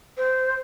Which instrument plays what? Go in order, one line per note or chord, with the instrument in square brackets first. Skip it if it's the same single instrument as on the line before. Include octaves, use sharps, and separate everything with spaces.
[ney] C5